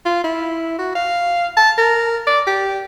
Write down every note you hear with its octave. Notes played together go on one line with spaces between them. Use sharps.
F4
E4
F#4
F5
A5
A#4
D5
G4